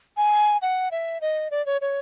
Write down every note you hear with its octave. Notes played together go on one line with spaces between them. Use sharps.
G#5
F#5
E5
D#5
D5
C#5
C#5